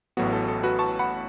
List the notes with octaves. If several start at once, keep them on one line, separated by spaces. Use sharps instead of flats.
A1 A2 F#3 B3 F#4
A4
A4
F#4 B4
A5 C#6
F#5 B5